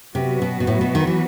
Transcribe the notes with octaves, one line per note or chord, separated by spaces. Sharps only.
C3 F#3 B3 F#4 B4
B2
B2
A2
B2
D#3
E3